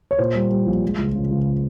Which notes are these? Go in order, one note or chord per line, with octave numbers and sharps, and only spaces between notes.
C#5
A#2 C5
G3
G3
A#1
G#3
C#2
C#3
C#2